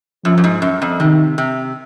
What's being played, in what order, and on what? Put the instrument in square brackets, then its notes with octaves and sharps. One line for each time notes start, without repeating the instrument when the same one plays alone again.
[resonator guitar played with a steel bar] F#2 [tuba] F3
[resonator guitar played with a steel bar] F#2
G#2
F#2
F2
[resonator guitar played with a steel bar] C3 [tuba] D#3
[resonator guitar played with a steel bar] C3